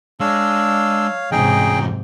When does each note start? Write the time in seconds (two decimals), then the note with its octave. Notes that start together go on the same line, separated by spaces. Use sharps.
0.20 G#3 D4 C#5 F5 E6
1.32 E2 G#2 C3 C#4 D#4 G#4 D#5 G5